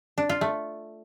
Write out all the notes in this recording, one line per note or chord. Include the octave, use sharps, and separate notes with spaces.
D4
F4
A3